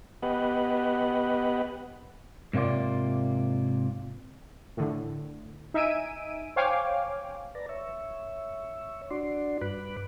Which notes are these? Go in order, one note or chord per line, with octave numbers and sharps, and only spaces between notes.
B3 G4 B4 D#5 F#5
G#2 C3 A#3 F4 D5
A2 D3
D#4 E5 G#5 E6 D7 D#7
C5 C#5 F5 G5 G#5 D6
B4 D5 A5 A#5
C#5 E5
D4 F#4 D5 C6
G2 B4 B5 D6 F#6